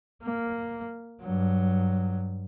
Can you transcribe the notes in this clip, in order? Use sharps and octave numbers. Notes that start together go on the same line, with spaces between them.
A#3
G2 F#3